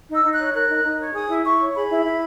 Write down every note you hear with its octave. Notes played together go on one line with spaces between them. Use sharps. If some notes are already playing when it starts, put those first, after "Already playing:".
D#4 E6
D#4
F#6
C#5
A#4 F#6
D#4
D#4
C#5
G#4 D#6
E4
E4 C#6
C#5
G#4 B5
E4
E4